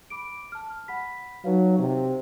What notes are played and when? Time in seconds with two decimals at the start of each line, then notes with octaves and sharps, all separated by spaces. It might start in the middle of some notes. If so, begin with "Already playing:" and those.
0.10 B5 D6 D7
0.52 A5 F6
0.88 F#5 B5 B6
1.44 F#3 D#4 B4 F5
1.79 C3